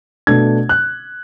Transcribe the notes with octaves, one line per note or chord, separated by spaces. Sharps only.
B2 A3 D4 G#6
F#6